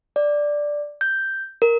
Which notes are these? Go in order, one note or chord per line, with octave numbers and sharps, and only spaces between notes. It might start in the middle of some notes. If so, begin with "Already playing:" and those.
D5
G6
A#4